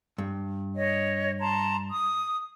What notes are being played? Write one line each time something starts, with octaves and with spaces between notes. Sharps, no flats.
G2
C#5 D#5
A5 A#5 C6
D#6